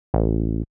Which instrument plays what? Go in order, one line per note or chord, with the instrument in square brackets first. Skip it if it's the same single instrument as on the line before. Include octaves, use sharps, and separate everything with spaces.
[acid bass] A1